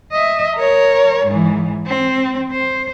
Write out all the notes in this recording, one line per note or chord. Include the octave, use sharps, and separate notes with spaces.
D#5 E5
A#4 C#5
G#2 E3
C4
C5